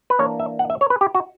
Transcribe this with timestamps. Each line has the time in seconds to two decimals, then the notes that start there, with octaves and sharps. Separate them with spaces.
0.10 B4
0.19 E3 A#3 D4 C#5
0.40 E5
0.59 F#5
0.70 E5
0.81 C#5
0.90 B4
1.01 G4
1.15 F#4